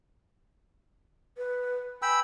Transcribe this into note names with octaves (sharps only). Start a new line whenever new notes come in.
B4
G5 G#5 B5 E6